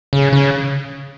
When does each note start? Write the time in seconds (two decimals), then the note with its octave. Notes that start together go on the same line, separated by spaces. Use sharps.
0.13 C#3
0.33 C#3